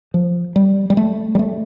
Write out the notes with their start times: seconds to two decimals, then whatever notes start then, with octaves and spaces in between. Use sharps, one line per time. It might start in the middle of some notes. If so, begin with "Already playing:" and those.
0.14 F3
0.56 G3
0.90 G3
0.97 A3
1.35 G3
1.39 A3